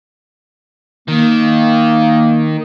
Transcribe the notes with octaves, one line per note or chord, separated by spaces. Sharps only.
D#3 A#3